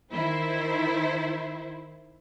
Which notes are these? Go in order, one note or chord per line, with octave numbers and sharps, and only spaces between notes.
D#3 E4 C5